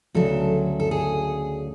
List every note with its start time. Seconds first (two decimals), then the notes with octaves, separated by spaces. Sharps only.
0.15 D2 C#3 F#3 A4
0.80 A4
0.91 G#4